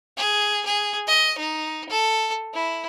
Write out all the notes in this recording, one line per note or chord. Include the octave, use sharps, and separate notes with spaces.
G#4
G#4
D#5
D#4
A4
E4